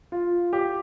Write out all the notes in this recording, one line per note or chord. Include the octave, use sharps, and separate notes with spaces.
F4
G4